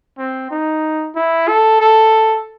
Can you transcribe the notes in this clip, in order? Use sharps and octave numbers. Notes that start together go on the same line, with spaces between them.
C4
D#4
E4
A4
A4